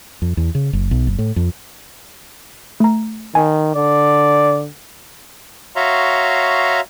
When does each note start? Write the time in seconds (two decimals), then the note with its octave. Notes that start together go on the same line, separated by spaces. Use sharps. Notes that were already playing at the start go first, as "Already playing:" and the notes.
0.22 F2
0.37 E2
0.55 C#3
0.73 F#1
0.91 B1
1.07 F#1
1.19 A2
1.36 F2
2.80 A3 A#5
3.35 D#3 G#5
3.75 D3 D5
5.76 F#4 C#5 E5 F5 A#5 C6